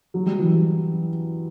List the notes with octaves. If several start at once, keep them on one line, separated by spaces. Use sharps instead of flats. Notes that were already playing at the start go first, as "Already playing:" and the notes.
F#3
G3
E3 F#3